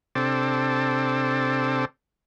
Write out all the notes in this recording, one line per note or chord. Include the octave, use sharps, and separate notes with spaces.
C3 C4 D4 A4